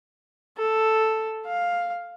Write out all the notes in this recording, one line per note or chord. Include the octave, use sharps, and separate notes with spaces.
A4
F5